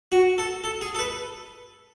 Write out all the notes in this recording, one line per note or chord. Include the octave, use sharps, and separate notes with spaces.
F#4
A4
A4
G#4
A4
B4